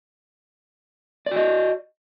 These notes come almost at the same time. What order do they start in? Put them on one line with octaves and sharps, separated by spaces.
D5 F#4 D#5